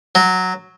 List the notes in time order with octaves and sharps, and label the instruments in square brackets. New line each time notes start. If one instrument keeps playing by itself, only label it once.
[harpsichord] F#3